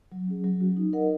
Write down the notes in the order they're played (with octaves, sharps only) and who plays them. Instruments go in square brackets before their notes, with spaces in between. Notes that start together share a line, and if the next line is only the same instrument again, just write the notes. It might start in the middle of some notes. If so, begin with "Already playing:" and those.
[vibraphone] F#3
C#4 G#4
F#3
C#4 F#4
D#4
A#4 D#5 F#5